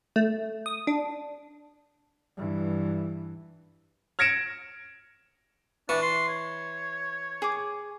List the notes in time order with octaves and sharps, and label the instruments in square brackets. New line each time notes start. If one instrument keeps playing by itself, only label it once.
[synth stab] A3
D#6
D4
[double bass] G2 E3
[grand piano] F6 G#6 A#6 C#7 D7 E7
[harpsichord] E3 [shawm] D4 [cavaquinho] C#6
[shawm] C6
C#5
[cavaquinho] G#4 D6